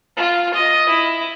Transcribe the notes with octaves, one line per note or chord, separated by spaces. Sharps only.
F4
D#5
E4